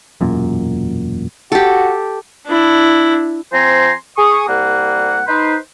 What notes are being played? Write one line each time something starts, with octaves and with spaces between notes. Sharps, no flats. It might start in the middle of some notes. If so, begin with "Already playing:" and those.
E1 F#2 A#2
F#4 G4 A4
D4 E4
F3 C4 C5 G#5 A#5 C6
G#4 C#6 D#6
C2 G3 A#3 F#5
D#4 B4 C5